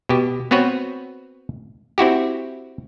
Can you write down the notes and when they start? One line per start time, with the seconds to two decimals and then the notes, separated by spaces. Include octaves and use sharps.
0.09 B2 G4
0.51 B3 C4 F#4 B4 C#5
1.98 C4 E4 F#4 G4